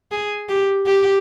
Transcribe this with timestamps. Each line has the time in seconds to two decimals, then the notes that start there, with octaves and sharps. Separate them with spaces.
0.12 G#4
0.49 G4
0.86 G4